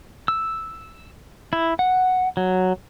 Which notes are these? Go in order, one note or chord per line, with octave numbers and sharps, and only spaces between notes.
E6
E4
F#5
F#3